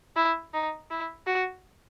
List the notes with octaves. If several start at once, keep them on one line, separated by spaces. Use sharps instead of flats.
E4
D#4
E4
F#4